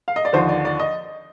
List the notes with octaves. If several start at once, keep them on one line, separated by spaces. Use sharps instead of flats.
F5
D#5
D5
D#2 D3 F3 C5
D5
D5
D#5